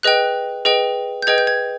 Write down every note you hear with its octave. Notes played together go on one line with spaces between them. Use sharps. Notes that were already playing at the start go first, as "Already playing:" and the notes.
G#4 B4 D#5 G5 F#6
G#4 B4 D#5 G5
G6
G#4 B4 D#5 G5 G#6
G6
G#6